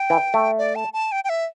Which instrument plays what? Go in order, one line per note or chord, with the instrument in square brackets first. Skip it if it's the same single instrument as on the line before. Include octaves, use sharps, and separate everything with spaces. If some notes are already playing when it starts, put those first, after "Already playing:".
Already playing: [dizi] G5
[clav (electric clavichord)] E3
A3
[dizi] D5
A5
A5
G5
G5
E5